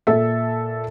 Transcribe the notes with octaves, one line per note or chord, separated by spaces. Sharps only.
A#2 A4 E5